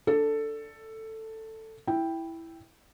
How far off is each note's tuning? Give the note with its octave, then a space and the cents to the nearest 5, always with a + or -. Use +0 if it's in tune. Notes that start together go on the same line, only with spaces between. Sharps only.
D4 +0 A4 +10
E4 +0 G5 +0